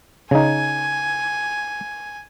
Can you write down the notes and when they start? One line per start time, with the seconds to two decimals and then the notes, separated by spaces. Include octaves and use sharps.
0.31 C#3 D#4 G#5